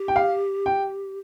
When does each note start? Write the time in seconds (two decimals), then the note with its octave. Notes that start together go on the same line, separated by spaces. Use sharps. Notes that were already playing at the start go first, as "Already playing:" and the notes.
Already playing: G4
0.08 G5
0.16 F5
0.66 G5